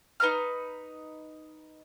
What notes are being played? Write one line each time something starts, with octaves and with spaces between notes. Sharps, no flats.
D#4 B4 A#5 F6